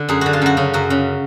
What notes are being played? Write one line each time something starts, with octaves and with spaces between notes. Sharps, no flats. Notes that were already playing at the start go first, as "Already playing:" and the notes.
Already playing: D3
F#2 G#4
D3 F#4
F4
F#2 F#4
C#3
F#2 F#4
C#3